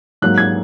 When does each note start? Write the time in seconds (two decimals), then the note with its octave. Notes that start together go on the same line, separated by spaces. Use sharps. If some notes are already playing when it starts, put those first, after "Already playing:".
0.22 G#2 F#3 A#3 F#6
0.38 G#6